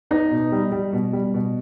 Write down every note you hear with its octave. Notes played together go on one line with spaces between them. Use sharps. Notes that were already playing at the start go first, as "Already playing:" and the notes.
B3 D#4
B2
G3
G3
B2
G3
B2